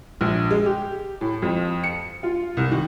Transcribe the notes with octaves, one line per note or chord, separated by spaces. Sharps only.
A#1
G#3
G4
A2
F2
C#7
F4
C2
D#3